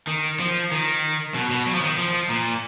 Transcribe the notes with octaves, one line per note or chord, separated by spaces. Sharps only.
D#3
F3
D#3
B2
B2
F#3
F3
D#3
F3
A#2